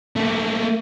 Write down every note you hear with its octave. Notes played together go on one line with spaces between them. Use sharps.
A3 A#3